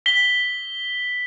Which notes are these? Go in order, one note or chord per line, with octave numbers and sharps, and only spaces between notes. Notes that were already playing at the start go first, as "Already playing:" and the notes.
B6 G7